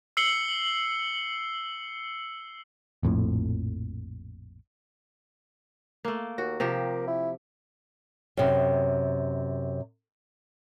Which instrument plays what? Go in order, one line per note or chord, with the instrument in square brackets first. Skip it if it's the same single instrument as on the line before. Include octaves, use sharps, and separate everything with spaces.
[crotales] E6 C7 C#7 F#7 G7
[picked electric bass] A#1 F2 A2
[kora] A3 A#3
[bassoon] D#2 [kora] F#4
[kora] C3 F3 G4 [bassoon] A#3
[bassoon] E4
[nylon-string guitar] F#2 C3